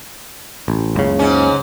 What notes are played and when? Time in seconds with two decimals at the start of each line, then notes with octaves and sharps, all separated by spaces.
0.68 A1
0.96 F#1 C#2 C#3
1.19 G#2 C#4